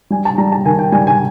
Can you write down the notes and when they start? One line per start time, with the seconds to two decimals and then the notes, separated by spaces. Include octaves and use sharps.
0.10 G3 G#5
0.25 A5
0.38 G3 A#5
0.52 A5
0.65 D#3 G#5
0.79 G5
0.92 G3 G#5
1.07 G#5